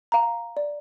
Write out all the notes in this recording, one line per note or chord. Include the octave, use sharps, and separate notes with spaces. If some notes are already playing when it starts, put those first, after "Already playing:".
F5 A#5
D5